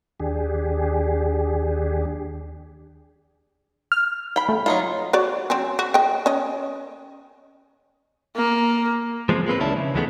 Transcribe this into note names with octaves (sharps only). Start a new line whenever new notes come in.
D#2 D4 G4 G#4
F6
G5 B5
A3
F#3 D#4 F4
F#4 C#5 D5
F#3 C4 C#4
F#4
D#5 G5
C#4 D#5
A#3
F3 G#3 A#3 C4
G#3 A#3 C4 B4
C#2 D#3 C#4 D4 E4 A5
C#3
D2 D3 E3 G#3 A3 B3